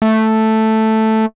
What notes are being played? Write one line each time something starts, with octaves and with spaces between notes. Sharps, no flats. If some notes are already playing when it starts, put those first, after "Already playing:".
A3